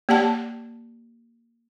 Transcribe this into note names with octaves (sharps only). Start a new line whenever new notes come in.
A#3 G4 D5 F#5 A5